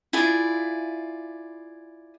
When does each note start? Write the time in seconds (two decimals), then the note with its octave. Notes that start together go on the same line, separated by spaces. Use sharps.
0.13 E4 F4 G#4 D5